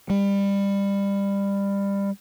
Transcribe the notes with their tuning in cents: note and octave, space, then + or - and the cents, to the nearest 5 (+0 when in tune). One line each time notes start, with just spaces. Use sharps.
G3 +25